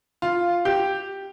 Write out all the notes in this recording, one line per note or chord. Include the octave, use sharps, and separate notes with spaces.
F4
G4